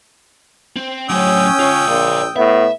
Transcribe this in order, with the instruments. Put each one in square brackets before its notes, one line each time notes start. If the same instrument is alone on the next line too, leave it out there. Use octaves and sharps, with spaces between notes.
[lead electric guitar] C4
[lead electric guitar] A2 F#3 [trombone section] C#4 [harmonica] G5 D#6 E6
[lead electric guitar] F4 C#5
[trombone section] A#1 A#2
[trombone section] A2 B3 [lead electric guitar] E5